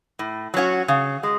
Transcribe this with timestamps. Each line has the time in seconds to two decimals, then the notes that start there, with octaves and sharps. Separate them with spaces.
0.19 A2
0.54 F#3 C#4 F#4
0.88 C#3
1.23 G#3